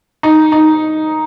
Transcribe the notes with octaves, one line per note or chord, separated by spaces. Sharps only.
D#4
D#4